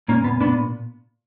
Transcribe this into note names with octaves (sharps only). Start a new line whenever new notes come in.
A#2 A#3 C#4
A#2 B3
A#2 B3 D4